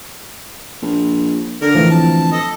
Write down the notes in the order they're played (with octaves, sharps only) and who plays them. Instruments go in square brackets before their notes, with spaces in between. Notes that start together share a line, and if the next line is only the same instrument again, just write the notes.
[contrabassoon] A#1
[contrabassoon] D3 [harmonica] A#4
[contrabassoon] A2 [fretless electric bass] E3 F3
[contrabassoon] D1 [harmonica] A5
[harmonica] A4 D#5